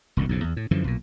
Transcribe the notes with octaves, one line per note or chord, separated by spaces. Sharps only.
E1 C#2 A2
B1 F2 C#3
E2
A2
F#2 D3 E3 F3
B1 A#2